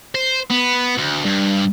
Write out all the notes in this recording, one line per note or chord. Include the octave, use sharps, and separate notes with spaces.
C5
B3
D2
G2